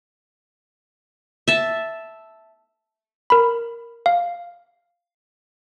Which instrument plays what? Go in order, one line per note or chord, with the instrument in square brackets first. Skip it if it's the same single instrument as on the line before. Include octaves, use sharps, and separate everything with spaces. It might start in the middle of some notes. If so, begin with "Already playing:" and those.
[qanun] E5 A5
[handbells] A#4 B5
F5